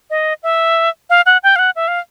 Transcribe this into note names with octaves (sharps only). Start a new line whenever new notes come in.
D#5
E5
F5
F#5
G5
F5
F#5
E5
F5